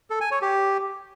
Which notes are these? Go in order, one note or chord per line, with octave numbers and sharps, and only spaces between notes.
A4
G#5
C#5
G4